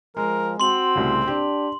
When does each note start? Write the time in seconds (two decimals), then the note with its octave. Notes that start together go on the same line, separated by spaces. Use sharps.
0.17 F3 G#3 A#4
0.60 C4 F#4 C6 F#7
0.95 C2 A2 C#3
1.27 D4 G4